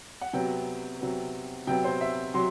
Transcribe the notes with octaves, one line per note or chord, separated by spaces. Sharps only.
F#5
C3 F#3 B3 G5
C3 F#3 B3
C3 F#3 B3 G5
C5
E5
C3 F#3 C6